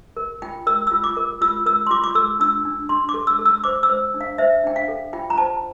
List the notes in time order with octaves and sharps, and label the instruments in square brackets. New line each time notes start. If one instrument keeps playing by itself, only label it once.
[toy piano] A#4
F4 G5
A#4 E6
F4 E6
D6
A#4
F4 E6
A#4 E6
C6
F4 D6
D6
A4 E6
D4 E6
D4
D4 C6
D6
A4
E6
A4
E6
C5 D6
E6
C5
D4
F5
C5 E5
D4 G5
F5
A4
F4 G5
A#5
C5 A5